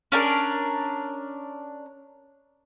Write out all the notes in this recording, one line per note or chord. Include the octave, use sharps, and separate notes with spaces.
C#4 D4 A#4